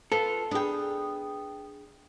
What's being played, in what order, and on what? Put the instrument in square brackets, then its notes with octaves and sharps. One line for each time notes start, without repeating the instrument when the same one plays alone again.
[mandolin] F4 [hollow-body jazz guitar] A4 [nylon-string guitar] B4
[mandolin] B3 G5 [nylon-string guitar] D4 G#4